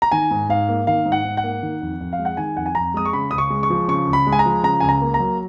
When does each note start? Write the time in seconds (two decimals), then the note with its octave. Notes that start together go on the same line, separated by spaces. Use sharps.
0.02 A#5
0.12 D#3 G#5
0.31 G#2
0.49 G#2 F5
0.69 A#3
0.87 D#3 F5
1.05 G#2
1.12 F#5
1.25 G#2
1.37 F#5
1.44 A#3
1.63 D#3
1.82 F2
2.01 F2
2.13 F5
2.19 G#3
2.25 F#5
2.37 D#3 G#5
2.57 F2 F#5
2.66 G#5
2.75 F2 A#5
2.94 G#3 D#6
3.05 C#6
3.13 C#3 B5
3.31 C#2 D#6
3.38 C#6
3.50 G#3
3.63 C#6
3.70 F3
3.88 C#3 C#6
4.07 C#2
4.13 B5
4.27 G#3
4.32 G#5
4.39 A#5
4.46 F3
4.63 C#3 A#5
4.80 C#2 G#5
4.89 A#5
5.02 A#3
5.14 A#5
5.20 F#3